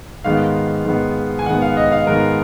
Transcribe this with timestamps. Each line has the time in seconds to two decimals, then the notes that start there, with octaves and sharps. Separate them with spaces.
0.24 G#2 D#3 G#3 B3 F5
0.85 G#2 D#3 G#3 B3
1.39 G#5
1.46 G#2 D#3 G#3 B3 F#5
1.62 F5
1.77 D#5
1.92 F5
2.07 G#2 D#3 G#3 B3 A#4